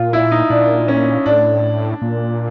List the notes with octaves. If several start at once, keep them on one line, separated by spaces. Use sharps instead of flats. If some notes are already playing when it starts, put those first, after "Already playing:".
Already playing: A#2 F4
E4
D#4
A#2 D4
C#4
A2 D4
A#2